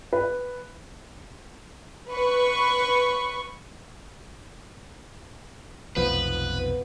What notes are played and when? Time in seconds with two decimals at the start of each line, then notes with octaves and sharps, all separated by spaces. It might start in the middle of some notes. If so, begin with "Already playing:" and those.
0.13 B4
2.10 B4 C#6
5.96 F1 B1 F3 B3 B4